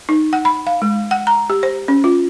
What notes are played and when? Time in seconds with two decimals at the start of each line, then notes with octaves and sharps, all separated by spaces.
0.09 D#4
0.33 F#5
0.45 B5
0.67 F5
0.82 G#3
1.11 F#5
1.27 A#5
1.50 G4
1.63 C5
1.88 C#4
2.04 F4